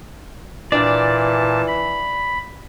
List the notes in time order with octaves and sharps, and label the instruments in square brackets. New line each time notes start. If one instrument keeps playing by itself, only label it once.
[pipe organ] A#2 A5 [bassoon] E3 [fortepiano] D4 [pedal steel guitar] D5
[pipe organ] B5